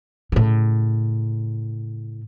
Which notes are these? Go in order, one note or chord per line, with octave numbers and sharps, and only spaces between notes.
A2 C#3